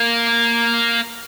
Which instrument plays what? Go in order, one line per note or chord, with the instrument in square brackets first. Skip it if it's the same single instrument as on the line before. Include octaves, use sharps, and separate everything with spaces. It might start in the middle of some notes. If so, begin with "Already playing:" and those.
Already playing: [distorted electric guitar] A#3